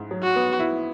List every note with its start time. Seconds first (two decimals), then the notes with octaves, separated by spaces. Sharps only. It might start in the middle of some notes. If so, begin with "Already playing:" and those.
Already playing: G#2 E4
0.11 F#3
0.23 F#4
0.36 B3
0.59 E4